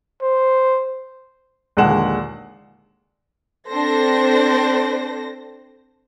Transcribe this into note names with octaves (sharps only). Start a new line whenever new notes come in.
C5
A#1 D#2 D3 G#3 F#5 E7
C4 D4 A4 C5 A#6